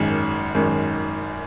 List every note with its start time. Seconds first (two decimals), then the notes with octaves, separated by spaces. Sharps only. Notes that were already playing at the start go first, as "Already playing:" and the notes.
Already playing: G#1 F#2 D#3 G#3
0.55 G#1 F#2 D#3 G#3